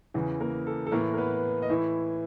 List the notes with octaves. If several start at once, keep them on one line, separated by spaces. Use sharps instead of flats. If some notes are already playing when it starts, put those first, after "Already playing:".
E2 C#3 E3
A#3 A#4
A4
A4
A2 E3 A#3 A#4
A#4
B3 B4
D#5
A2 E3 E4 E5